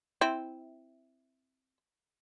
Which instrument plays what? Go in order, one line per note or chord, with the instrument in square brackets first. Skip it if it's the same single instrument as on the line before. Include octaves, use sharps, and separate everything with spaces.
[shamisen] C4 E4